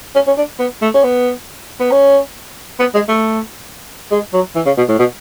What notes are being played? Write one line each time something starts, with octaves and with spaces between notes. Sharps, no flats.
C#4
C#4
D4
B3
A3
C#4
B3
B3
C#4
B3
G#3
A3
G#3
F#3
E3
C#3
B2
A2
B2